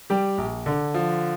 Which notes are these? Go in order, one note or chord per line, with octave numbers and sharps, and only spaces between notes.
G3 G4
A#1
D3
F3